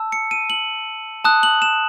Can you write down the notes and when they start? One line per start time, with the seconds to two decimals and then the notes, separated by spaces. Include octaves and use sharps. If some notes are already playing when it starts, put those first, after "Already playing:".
Already playing: A5 E6
0.12 C#7
0.31 D#7
0.50 F#7
1.25 A5 D#6 F#6
1.43 F#7
1.62 E7